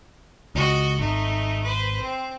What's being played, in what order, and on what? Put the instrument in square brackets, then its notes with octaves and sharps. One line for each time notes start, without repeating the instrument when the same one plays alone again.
[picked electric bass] C#2 [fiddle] F#4 D#5
[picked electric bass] G#1 [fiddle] A3 D#4
[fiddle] B4 C5
C4